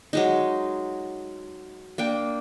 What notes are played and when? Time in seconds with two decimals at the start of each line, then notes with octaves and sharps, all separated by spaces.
0.13 F#3 G#3 D#4
1.98 A#3 D4 G5